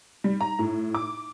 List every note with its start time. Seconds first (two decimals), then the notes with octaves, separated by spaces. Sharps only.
0.24 G3
0.41 A#5
0.59 A2
0.94 D6